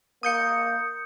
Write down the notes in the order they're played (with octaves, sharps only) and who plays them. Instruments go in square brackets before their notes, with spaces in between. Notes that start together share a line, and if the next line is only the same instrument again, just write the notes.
[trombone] A#3 [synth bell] D#6 G6 C#7